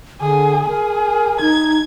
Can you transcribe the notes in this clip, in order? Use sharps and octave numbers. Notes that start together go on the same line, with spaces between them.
D3 G#4
G#4 A#4
D#4 G#6